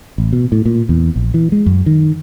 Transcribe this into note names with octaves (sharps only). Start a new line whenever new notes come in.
A1
B2
A2
A#2
E2
A#1
E3
G#3
F#2
D#3